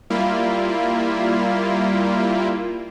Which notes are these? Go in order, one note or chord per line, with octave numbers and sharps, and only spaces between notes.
G3 A#3 E4 F4